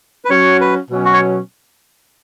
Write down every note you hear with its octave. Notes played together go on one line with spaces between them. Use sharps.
B4
F#3 C#4 F#4 C#5
B4
B2 F#3 C#4
F#4
C#5